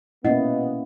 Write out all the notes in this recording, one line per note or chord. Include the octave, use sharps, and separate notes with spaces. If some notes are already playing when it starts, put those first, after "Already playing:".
B2 A#3 B3 C#4 E4 D#5 F#5